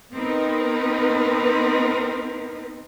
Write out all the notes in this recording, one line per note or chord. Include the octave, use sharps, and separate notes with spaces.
B3 C4 D#4 A#4 B4